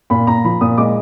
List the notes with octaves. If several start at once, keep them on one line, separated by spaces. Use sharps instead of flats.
A#2 B5
A#2 A#5
F3 B5
A#2 D#6
G#3 D6